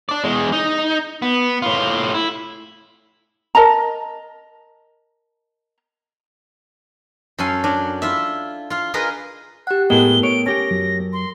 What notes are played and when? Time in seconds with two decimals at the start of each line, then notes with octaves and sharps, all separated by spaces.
0.09 D4 D5
0.24 E2 G#3
0.52 D#4
1.22 B3
1.62 A2 F4
2.14 E4
3.55 A#4 D#5 A5 A#5
7.39 F#2 C#4 A4 F5 G#5 C6
7.64 F#3 D4
8.02 E4 F4 E5
8.70 F4 F5
8.94 F4 G#4 A#4 B4 D#5
9.67 G4 F#5 F#6
9.90 A2 G#3 A3 B3 A4 A#4 G5 G7
10.23 C#5 D7
10.46 C#4 G4 G5 A#6
10.70 F#2 F#3
11.13 C6